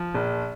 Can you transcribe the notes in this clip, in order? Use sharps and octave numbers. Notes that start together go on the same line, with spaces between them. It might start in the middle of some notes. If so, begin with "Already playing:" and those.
Already playing: F3
A#1